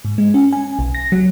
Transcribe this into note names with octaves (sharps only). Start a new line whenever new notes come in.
G#2
G#3
C#4
G#5
B1
A#6
F#3